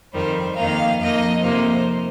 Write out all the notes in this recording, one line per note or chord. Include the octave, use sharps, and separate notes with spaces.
F2 D#3 G3 C5
F2 D#3 A#3 D#4 F5
F2 F3 A#3 D#4 D#5
F2 C3 F3 A#3 D#4 C5